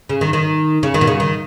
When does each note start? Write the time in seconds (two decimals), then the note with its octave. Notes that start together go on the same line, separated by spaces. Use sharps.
0.09 C#3
0.21 D#3
0.33 D#3
0.83 C#3
0.94 D#3
1.01 B2
1.07 C#3
1.20 D#3